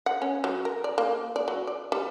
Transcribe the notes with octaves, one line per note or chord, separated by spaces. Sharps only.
F#5
C#4
F#3
A#4
D5
A#3
D5
F#3
D5
G3